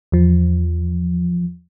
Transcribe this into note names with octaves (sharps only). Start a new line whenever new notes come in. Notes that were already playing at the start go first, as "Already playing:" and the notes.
E2 F3